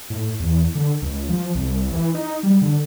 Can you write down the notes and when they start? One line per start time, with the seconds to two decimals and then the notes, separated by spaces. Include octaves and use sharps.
0.10 A2
0.40 E2
0.75 D3
1.02 C#2
1.29 F3
1.55 C2
1.92 E3
2.15 D#4
2.43 G3
2.62 D3